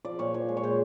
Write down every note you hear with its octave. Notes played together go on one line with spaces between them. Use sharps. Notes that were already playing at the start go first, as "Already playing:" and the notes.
F3 D5
A#2 C#5
F3 C#5
G#3
C#5
A#2 C5